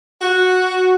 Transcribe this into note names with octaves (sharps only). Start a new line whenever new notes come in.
F#4